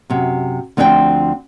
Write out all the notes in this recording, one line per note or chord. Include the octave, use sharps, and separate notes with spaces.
F#2 C3
D2 F3 C4 D4 E5 G5